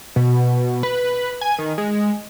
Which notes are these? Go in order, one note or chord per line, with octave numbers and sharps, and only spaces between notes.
B2
B4
G#5
D#3
G#3